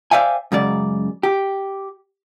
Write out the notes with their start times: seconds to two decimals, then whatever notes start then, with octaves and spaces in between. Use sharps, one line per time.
0.11 C5 D5 E5 F5 G5 G#5
0.52 F#2 C#3 G#3 D5
1.23 G4